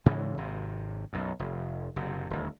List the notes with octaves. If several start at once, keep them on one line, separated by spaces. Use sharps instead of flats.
G#2 C#3 E3 G#3
G#1 C3
B1 F#2
F1
F#1 C3
D#1 D2